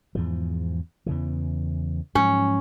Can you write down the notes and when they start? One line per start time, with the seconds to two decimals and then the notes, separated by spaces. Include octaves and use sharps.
0.15 E2 G#2 F3
1.06 E2 C#3 E3
2.15 G#2 F3 F#3 C#4